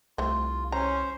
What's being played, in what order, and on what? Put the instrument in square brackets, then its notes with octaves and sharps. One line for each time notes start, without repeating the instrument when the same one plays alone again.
[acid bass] C2 [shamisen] A3 C5 [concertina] F4
[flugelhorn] C#4 [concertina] C5 [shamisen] A#5